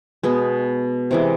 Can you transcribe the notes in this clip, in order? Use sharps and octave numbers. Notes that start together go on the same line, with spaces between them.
B2 G#3 B3
C3 E3 G#3